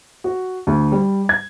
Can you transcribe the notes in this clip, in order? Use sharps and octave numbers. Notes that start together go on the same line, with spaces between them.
F#4
D2
G3
G#6